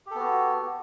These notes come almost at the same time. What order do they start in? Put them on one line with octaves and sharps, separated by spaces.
G4 A4 B3 F#4